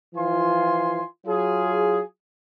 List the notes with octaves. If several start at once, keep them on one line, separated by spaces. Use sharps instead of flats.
E3 F3 F4 G#5 C6
F#3 F4 G#4